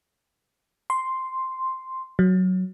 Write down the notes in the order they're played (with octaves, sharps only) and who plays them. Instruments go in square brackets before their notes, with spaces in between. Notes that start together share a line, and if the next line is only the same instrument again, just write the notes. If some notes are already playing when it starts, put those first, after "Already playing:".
[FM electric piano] C6
F#3